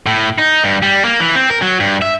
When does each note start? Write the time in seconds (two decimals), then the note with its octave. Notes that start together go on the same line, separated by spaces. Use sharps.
0.06 A2
0.38 D#4
0.64 G2
0.83 G3
1.05 A#3
1.20 E3
1.35 C4
1.50 A#4
1.62 F#3
1.80 G2
2.02 E5